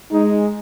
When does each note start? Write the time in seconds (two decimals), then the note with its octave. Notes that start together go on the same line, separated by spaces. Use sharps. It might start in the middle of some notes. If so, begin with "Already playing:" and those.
0.12 G#3 D#4